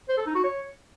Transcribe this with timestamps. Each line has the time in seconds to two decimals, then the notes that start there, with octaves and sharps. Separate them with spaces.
0.09 C5
0.18 A4
0.26 D#4
0.35 F#4
0.44 C#5